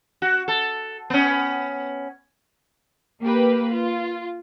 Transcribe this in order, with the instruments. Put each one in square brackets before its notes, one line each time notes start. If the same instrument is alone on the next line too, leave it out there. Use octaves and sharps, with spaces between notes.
[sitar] F#4
A4
B3 C#4
[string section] A#3 G4 B4
F4